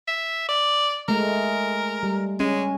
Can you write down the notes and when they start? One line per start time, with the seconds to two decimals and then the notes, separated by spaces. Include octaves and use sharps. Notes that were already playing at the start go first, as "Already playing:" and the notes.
0.08 E5
0.49 D5
1.08 G#3 A3 A#4
2.03 G3
2.40 G#3 C#4